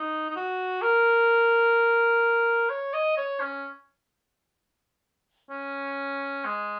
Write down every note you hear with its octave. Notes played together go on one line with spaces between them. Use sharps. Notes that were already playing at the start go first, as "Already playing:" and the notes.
Already playing: D#4
D#4
F#4
A#4
C#5
D#5
C#5
C#4
C#4
G#3